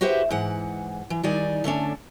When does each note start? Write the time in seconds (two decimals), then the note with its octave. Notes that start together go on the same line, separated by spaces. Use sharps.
0.01 F#4 G4 B4 C5 E5
0.31 G#2 E3 F#5
1.10 E3
1.23 D#3 G3 D#4 D5 G#5
1.64 D3 A3 C#4 D4